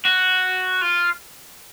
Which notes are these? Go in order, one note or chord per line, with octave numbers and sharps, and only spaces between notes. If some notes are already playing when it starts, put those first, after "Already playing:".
F#4
F4